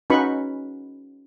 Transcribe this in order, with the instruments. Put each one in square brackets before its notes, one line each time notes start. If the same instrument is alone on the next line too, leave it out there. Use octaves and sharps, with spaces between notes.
[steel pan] C#4 D#4 F#4 B4 B5 C#6